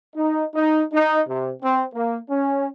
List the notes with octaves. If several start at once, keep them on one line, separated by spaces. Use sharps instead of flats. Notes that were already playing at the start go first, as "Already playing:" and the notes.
D#4
D#4
D#4
C3
C4
A#3
C#4